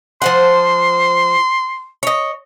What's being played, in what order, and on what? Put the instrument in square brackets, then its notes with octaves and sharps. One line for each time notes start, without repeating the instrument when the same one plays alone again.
[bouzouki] F3 C5 F#5 [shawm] C6
[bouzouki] C#5 D#5